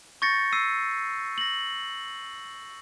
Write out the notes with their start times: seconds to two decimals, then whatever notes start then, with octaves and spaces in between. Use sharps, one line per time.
0.22 C#6 G6 A6 A#6 C#7
0.53 E6 C7 D#7
1.38 A#6 F#7